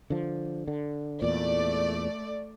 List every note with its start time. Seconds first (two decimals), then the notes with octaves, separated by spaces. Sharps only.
0.10 D3 F3
0.68 D3
1.22 E2 A#2 A3 D5